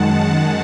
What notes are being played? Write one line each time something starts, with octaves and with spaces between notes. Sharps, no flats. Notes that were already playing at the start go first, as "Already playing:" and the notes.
Already playing: F#2 D#3 G#3 F#5 A5